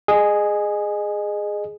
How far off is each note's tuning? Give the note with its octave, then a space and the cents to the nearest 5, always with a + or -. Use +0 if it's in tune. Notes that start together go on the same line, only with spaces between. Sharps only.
G#4 +0 D#5 -25